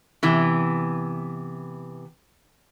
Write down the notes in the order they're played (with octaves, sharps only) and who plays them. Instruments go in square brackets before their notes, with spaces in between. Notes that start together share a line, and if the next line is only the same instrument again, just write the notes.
[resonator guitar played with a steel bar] C3 E3 B3